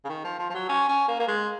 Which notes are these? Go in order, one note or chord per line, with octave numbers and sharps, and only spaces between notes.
C#3
D#3
F3
F3
F3
F#3
C#4
C#4
A#3
A#3
G#3